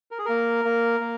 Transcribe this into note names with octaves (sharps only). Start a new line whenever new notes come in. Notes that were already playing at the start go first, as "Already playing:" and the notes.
A#4
G#4
A#3 A#4
A#3
A#3